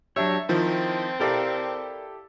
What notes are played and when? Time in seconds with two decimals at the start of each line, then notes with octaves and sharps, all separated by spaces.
0.16 F#3 D4 G4 C#5 E5 E6
0.49 D#3 F3 C4 E4
1.20 E4 G4 A4 A#4 D5 F5